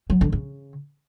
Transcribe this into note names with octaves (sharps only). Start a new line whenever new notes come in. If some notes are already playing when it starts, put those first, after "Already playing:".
F#3
D3
C#3